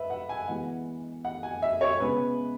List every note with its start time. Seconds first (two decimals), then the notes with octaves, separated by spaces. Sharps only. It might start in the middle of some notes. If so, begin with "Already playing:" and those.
Already playing: B4 E5
0.10 F#5
0.29 G#5
0.48 E3 G#3 B3 F#5
1.25 F#5
1.43 G#5
1.62 E5
1.81 C#5
2.00 C#3 G#3 B3 B4